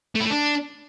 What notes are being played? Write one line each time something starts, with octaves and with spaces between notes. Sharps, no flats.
A3
E4
A3
D4